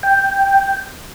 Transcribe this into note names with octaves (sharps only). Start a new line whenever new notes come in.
G5